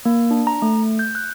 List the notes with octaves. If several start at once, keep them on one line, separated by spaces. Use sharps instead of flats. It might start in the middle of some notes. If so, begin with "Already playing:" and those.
A#3
D4
A#5
A3
G6
F#6